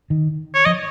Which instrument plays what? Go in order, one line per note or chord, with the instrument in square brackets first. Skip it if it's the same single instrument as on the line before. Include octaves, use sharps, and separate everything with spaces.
[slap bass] D#3
[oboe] C#5
[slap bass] F3 [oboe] D#5